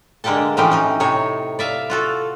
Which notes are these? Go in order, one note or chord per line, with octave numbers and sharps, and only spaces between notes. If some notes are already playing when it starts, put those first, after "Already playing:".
D3 G#3 A#3 G4 A4 A5
A2 E3 F3 C4 C#4 G4
C#4 D#4
A2 C3 D#4 C#5
D5 E5 F5
F4 F#4 A4